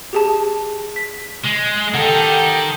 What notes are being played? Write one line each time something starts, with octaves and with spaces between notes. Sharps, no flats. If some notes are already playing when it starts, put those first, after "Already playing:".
G4 G#4 A5
B6
G#3
D#3 D#4 G4 A4 F#5